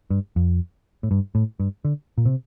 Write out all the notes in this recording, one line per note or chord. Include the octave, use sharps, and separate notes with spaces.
G2
F2
A2
G2
A2
G2
D3
A#2
C3